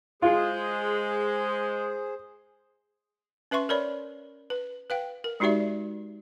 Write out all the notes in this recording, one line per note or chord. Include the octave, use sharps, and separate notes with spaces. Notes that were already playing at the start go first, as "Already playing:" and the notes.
G#3 F4 G#4 C5
C#4 B4 E5 C6 C#6
A#4 C#5 D5 B5
B4
B4 F5 G5
A#4
G#3 D#4 F#4 G4 D5 E5